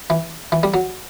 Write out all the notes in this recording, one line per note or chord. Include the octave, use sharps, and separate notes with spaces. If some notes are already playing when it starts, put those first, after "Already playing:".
E3
E3
G3
F#3